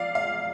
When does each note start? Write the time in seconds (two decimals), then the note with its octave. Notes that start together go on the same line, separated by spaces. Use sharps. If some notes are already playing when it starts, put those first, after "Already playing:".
Already playing: F2 D5 F5
0.15 F5